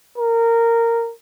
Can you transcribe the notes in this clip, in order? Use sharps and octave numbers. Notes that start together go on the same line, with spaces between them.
A#4